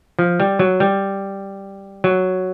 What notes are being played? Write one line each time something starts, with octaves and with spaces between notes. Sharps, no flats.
F3
G3
F#3
G3
F#3